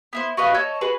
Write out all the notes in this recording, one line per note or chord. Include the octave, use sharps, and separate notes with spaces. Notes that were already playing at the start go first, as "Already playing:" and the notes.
B3 E4 C5
F#4 B4 D#5 F5
A4 C#5 D#5
F#4 G#4 B4